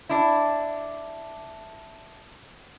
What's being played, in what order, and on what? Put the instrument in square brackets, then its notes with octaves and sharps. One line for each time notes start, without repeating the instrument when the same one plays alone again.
[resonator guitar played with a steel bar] D4 E4